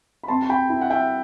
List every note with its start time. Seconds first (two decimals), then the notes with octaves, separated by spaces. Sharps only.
0.23 B5
0.28 C4 A5 C6
0.43 A5
0.50 G5 B5
0.70 E4
0.81 F#5
0.90 E5 G5